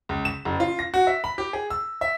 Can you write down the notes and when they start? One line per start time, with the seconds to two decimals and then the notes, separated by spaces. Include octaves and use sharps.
0.09 C#2
0.25 E7
0.45 F#1
0.60 F4
0.79 A#6
0.94 F#4
1.07 E5
1.24 B5
1.38 G4
1.53 G#4
1.70 E6
2.01 E5